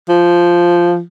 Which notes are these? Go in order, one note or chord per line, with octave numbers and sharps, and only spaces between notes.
F3